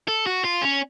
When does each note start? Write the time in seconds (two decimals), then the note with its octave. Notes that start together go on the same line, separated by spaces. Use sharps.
0.08 A4
0.26 F#4
0.44 F4
0.62 C#4